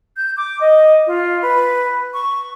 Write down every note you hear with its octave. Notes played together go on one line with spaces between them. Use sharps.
G6
D6
D#5
F4
B4
C#6